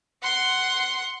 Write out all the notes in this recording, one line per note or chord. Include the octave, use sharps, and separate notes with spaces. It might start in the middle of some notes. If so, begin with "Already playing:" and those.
F#5 C6